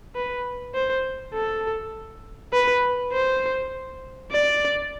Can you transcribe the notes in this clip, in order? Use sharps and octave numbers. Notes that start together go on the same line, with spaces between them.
B4
C5
A4
B4
C5
D5